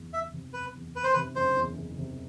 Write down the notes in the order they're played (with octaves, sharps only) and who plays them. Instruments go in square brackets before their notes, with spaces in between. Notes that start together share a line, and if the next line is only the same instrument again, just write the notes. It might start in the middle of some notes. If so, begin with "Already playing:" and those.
Already playing: [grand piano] F#1 E2
[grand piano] F#1 [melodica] E5
[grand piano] C3
[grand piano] F#1 [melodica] B4
[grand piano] E2
[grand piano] F#1 [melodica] B4
[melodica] C5
B4
[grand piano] C3
[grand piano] F#1 [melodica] C5
[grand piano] E2
F#1
C3